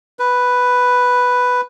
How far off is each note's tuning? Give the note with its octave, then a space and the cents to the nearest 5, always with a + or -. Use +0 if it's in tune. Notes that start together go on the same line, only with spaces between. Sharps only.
B4 +0